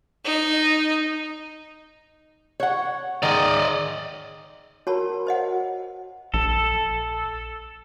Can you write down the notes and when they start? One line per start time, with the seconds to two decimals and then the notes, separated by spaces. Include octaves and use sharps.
0.25 D#4
2.60 C#5 F#5
3.23 D#3 G#3 D5 D#5
4.87 F#4 A#4 C#5 A5 B5
5.27 C5 D#5 F#5
6.34 A#1 A4